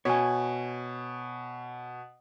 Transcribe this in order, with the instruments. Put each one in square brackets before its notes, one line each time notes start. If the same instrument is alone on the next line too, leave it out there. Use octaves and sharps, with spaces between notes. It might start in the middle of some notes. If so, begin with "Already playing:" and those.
[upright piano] B2 [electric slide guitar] C#5 G#5